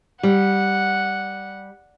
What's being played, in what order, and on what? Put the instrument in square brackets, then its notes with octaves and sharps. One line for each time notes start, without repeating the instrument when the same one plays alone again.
[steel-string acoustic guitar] G3 [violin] F#5